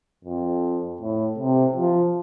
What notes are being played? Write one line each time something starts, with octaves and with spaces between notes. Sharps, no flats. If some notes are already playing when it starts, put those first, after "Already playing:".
F2
A2
C3
F3